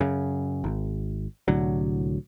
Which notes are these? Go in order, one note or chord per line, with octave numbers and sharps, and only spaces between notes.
F#2 C#3
G#1
C2 A2 D3 F#3